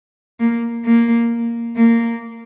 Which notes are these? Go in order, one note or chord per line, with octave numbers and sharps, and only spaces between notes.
A#3
A#3
A#3